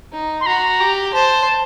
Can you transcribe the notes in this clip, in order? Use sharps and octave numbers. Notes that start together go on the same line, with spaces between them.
D#4
C6
F#4 A#5
G4
C5 A5